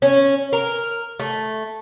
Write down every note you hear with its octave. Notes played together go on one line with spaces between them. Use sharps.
C#4
A#4
A3